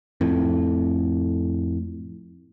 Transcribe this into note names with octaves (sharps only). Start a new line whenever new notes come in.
F2 A2